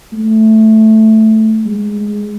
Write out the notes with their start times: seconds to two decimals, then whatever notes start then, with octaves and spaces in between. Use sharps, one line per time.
0.13 A3
1.66 G#3